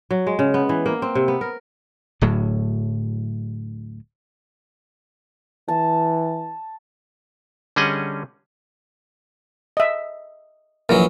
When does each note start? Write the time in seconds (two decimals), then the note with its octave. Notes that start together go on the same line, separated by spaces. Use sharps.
0.11 F#3
0.27 G#3
0.39 C#3
0.54 B3
0.69 E3
0.86 A#3
1.02 C4
1.15 C3
1.28 B3
1.41 A#4
2.21 D1 D2 A2 F#3
5.68 E3 A5
7.76 D3 G3 C#4 G#4 D#5 F#5
9.77 D#5 E5
10.89 A#1 E3 F#3 A#4